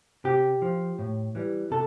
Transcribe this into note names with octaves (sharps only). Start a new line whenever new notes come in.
C3 G4
F3
A2
E3 G3
C3 A4